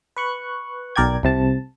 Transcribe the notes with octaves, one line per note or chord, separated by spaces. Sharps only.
B4 C#6 F#6
B1 A#4 D5 G5 G#6
C2 C3 A5